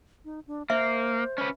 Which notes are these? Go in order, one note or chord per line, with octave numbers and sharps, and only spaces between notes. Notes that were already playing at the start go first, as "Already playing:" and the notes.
D#4
D4
A#3 C5 E5
C#4 B4